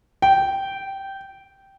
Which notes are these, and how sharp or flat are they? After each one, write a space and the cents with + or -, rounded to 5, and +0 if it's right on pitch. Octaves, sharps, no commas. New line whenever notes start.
G5 -10